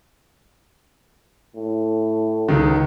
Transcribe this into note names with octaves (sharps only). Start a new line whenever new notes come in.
A2
C#2 D#3